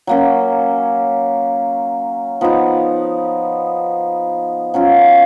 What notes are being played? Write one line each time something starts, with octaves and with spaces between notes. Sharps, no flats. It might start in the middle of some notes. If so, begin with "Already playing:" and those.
F#3 A#3 C#4
F3 B3 D#4
F#3 C#4 F4